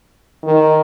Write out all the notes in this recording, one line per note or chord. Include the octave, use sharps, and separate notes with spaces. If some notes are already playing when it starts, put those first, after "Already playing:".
D#3